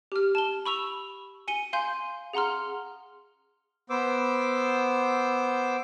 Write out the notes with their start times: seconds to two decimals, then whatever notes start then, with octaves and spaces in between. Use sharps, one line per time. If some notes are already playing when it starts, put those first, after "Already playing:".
0.12 G4 F6
0.35 A5 G7
0.66 B5 C#6 E6 F7
1.48 G#5 C#7 D#7 G7
1.73 F5 G#5 C6 G6 D#7
2.33 G#4 F#5 A#5 C6 F6
3.90 B3 C5 D6 E6